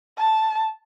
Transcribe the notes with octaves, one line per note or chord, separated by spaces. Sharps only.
A5